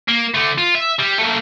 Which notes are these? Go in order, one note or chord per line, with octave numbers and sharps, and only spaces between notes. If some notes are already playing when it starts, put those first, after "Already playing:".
A#3
D3 A3
F4
E5
G3
A3 A#3